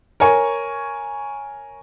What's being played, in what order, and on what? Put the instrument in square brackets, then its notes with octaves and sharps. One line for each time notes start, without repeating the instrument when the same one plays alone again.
[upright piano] A#4 C#5 G#5 C#6